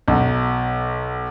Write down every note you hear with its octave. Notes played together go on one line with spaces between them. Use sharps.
B1